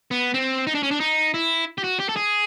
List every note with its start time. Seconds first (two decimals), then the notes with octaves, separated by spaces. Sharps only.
0.11 B3
0.34 C4
0.67 D#4
0.75 D4
0.83 C#4
0.91 D4
1.00 D#4
1.34 E4
1.78 G4
1.84 F#4
2.00 G4
2.09 A4
2.16 G#4